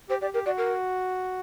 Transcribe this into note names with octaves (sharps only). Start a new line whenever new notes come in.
G4 C5
G4 D5
G4 A#4
F#4 D5
A#4